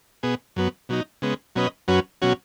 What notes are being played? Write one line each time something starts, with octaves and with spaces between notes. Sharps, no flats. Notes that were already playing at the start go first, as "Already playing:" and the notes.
B2 B3 G#4
F#2 F#3 B3
B2 F#3 D#4
C#3 G#3 B3
B2 F#3 C#4 B4 D#5
F#2 F#3 C#4 F#4 B4
B2 F#3 C#4 F#4